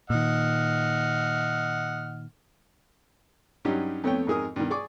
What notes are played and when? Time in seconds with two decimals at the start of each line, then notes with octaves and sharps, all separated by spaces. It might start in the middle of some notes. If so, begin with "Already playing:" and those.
0.10 A#2 D#3 D#5 F#5 F6
3.65 G2 F#3 C#4 D#4 G4
4.04 F2 A3 B3 C#5 G5
4.27 F2 G#2 G#4 A#4 D#6
4.56 G2 B2 D#3
4.70 G#4 D5 C#6 D6